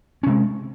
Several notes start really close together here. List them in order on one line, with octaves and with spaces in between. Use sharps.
C#4 C3 G#3